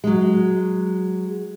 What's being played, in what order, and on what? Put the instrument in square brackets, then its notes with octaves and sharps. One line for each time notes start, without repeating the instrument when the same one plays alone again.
[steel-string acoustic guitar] F#3 G#3